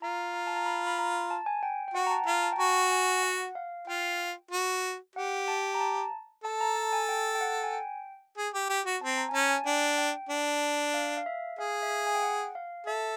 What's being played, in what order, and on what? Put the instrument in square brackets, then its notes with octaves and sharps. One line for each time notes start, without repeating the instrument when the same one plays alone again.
[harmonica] F4 [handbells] A#5
[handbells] A#5
A5
A#5
B5
B5
A#5
A5
G#5
G5
G5
[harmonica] F#4 [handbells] F#5
[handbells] A#5
A5
[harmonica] F4 [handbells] A#5
[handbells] A5
G5
[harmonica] F#4 [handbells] G#5
[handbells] G#5
F#5
F5
[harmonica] F4 [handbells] G5
[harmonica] F#4
[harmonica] G4 [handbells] F#5
[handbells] A5
A#5
A5
[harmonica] A4 [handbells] A5
[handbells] A#5
A5
G#5
G5
G5
F#5
G#5
G5
[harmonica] G#4
G4
G4
F#4
[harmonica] C4 [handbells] A5
[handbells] A#5
G#5
[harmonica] C#4 [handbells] A5
[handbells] G#5
[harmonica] D4 [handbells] G5
[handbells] G5
[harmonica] D4
[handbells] F5
F5
E5
[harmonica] G#4 [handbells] F5
[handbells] E5
F5
G#5
G5
F#5
F5
[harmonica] A4 [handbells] E5